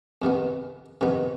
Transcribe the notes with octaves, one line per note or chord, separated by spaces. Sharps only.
F2 C3 D#3 B3
F2 C3 D#3 B3